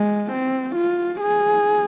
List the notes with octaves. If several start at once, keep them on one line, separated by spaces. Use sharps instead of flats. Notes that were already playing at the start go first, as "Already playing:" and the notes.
Already playing: G#3
C4
F4
G#4